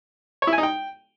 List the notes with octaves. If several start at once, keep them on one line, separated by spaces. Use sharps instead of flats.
C#5
E4
G#5
D#4
G5